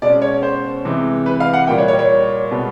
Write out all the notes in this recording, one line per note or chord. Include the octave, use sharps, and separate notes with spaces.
B2 G#3 C#4 D5
C#5
C5
C3 E3 G#3
B4
F5
F#5
A#2 G3 A#3 G5
C#5
C#5
C#5
B2 G#3 B3